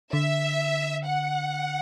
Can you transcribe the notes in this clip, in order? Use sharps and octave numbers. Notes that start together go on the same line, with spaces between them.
D3 E5
F#5